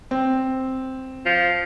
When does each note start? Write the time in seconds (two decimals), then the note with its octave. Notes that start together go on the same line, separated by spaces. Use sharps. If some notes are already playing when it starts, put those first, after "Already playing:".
0.11 C4
1.26 F3